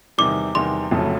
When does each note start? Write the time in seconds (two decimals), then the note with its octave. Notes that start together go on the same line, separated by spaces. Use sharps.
0.18 E2 C3 D#3 G3 D6
0.55 E2 C3 D#3 G3 C6
0.91 F1 F2 C#3 F#3 A3